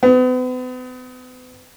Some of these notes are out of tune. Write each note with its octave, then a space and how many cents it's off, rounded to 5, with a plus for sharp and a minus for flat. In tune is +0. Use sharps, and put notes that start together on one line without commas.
B3 +40